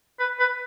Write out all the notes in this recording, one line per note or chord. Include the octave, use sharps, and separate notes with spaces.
B4
B4